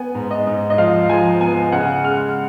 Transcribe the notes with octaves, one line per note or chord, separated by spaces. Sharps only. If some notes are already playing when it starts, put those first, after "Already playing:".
Already playing: B3 G#5
G#2
D#5
G#2
D#5
F3 F5
F3 G#5
B3 G#5
C#3 F#5
G#3 F6